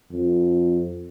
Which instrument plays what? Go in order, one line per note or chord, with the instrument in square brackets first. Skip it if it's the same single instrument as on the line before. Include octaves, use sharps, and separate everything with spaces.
[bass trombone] F2